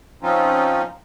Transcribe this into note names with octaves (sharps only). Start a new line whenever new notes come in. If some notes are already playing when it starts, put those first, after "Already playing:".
F3 C4 C#4 D#4 F4